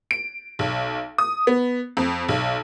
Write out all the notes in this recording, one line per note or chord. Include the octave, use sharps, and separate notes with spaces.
D7
B1
D#6
B3
F2
B1